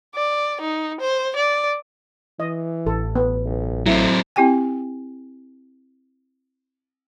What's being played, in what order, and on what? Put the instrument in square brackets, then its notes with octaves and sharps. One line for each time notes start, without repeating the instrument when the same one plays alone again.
[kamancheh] D5
D#4
C5
D5
[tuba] E3 [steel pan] D#5
[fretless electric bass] A1 [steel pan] A4
[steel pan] B3
[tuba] B1
[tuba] A2 [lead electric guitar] F#3 C4 [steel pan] E4
[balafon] C4 E4 G4 G5 G#5